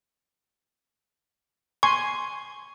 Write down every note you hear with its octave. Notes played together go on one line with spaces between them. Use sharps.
G#5 C6 C#6